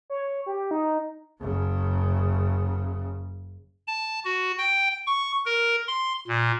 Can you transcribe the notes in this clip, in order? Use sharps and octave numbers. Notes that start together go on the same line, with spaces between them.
C#5
G4
D#4
F#1 C#3
A5
F#4
G5
C#6
A#4
C6
A#2